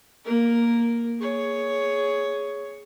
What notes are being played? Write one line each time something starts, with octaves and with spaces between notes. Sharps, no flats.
A#3 A#4
G#4 C#5